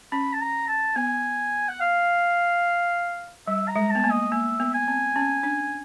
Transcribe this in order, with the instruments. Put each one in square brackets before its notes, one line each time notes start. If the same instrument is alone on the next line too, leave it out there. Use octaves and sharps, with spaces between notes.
[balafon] C#4 [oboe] B5
[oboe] A5
A#5
A5
[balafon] B3 [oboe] G#5
[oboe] F#5
F5
[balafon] G3 [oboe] E5
[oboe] A#5
[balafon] G#3
[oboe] A5
[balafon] B3
A#3
[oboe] D#5
[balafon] A#3 [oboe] E5
[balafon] B3
[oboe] G#5
[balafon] C4
C#4
D4